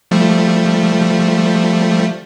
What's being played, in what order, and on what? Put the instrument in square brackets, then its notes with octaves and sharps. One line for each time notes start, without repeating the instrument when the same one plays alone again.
[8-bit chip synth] F3 G3 A3